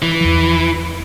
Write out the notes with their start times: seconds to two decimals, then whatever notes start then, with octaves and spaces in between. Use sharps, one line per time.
0.02 E3
0.21 E2 F3